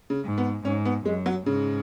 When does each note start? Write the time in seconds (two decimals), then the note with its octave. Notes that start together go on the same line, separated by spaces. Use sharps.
0.10 C#3
0.24 G#2
0.38 B3
0.65 G#2 C#4
0.85 B3
1.05 F#2 G#3
1.26 F#3
1.46 G#2 C#3